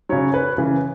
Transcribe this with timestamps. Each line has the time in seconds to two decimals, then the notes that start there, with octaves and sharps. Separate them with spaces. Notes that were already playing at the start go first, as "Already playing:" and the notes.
0.09 C#3 F#3 C#5
0.34 B4
0.58 C#3 E3